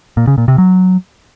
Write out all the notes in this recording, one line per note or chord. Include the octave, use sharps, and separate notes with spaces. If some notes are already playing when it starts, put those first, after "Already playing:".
A#2
C#3
A#2
C3
F#3